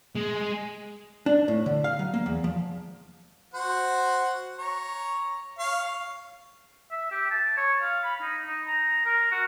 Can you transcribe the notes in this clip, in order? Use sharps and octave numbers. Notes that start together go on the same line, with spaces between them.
G#3
D4
A2
D3
F5
F#3
A#3
E2
F3
F#4 C5 F#5
C#5 A#5
C#5 F5
E5
G4
A5
C#5
F5
B5
D#4
D#4
A#5
A#4
F#4